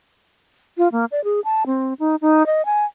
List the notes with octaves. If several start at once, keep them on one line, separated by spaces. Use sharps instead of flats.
F4
A#3
D5
G#4
A5
C4
D#4
D#4
D#5
G#5